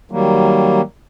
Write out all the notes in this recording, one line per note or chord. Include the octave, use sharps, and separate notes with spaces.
D#3 F#3 G3 A#3